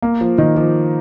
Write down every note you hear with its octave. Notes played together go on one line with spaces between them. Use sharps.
A#3
F3
D#3
F3